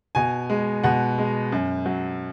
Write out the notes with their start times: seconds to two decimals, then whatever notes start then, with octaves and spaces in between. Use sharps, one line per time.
0.15 B2 G#5
0.50 G#3
0.84 B2 F#5
1.18 G#3
1.52 F#2
1.86 F#3